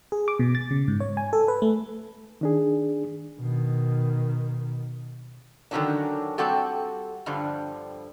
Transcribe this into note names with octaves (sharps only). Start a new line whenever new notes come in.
G#4
D6
B2
A6
C#3
G#2
C#5
G#5
A4
B4
A3
D#3 D4 G#4
B2 D#3
D3 D#3 F3 F#3 C#4 D4
G3 C4 F#4 G4 A4
G2 D3 F3 G3